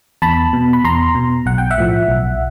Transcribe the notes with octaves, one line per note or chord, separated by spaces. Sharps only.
E2 A5 B5
B2
B5
E2 A#5 C6
B2
B1 F#5
G5
E5 F#5
A2 F3
B1